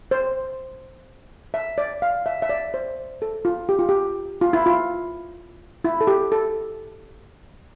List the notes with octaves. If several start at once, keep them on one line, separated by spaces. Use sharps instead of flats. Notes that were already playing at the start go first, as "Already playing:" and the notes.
C5
E5
D5
F5
E5
E5
D5
C5
A4
F4
G4
F4
G4
F4
E4
F4
E4
A4
G4
A4